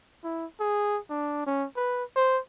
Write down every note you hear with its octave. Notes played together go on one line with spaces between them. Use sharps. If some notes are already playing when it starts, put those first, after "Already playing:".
E4
G#4
D4
C#4
B4
C5